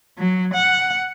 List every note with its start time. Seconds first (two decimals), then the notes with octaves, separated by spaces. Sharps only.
0.18 F#3
0.54 F#5